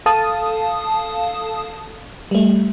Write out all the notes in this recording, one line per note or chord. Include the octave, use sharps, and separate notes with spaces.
A4 F5 A5 D#6
G3 A3